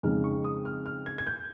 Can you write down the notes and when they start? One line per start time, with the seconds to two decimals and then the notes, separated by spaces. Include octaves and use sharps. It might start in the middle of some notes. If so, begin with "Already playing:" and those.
0.03 F2 C#3 G#3 D#4 F6
0.24 C#6
0.44 D#6
0.65 F6
0.86 F6
1.06 G#6
1.18 G#6
1.27 G6